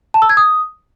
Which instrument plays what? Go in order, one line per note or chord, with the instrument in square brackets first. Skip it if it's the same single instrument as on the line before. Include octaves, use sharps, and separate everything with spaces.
[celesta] A5
E6
G#6
D#6